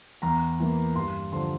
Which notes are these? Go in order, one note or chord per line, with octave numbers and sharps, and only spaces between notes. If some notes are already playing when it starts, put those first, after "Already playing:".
E2 A#5
E3 A#3
G2 C6
D3 F3 C6